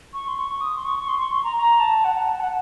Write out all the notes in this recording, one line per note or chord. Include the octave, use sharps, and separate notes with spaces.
C#6
C6
C#6
D#6
C6
C#6
C#6
C6
C#6
C6
A#5
A#5
A5
F#5
F#5
A5
F#5